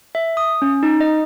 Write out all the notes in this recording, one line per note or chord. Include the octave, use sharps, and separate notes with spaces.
E5
D#6
C#4
D#4
D#5